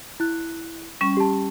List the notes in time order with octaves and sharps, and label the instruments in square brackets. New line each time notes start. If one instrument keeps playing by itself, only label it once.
[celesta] E4 F#6
[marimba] G3 C#4 [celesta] C#6
[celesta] G4 A5